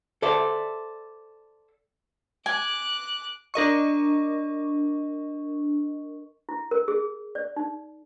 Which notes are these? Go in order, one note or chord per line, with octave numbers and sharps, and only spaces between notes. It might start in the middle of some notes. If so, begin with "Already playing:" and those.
A4 C5 D5 E5
G#5 D6 F#6
D4 A#4 D#5 C#6
E4
A#4
G#4
D5
D#4